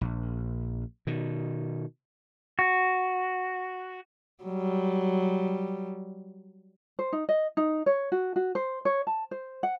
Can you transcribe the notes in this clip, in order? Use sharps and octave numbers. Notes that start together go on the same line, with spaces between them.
A#1
B2 D#3
F#4
F#3 G3
C5
D#4
D#5
D#4
C#5
F#4
F#4
C5
C#5
A5
C5
F#5